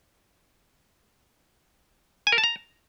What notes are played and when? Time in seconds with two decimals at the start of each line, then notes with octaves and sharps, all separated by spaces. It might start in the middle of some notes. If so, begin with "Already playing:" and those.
2.27 G#5
2.32 A#4
2.38 A5
2.44 A#5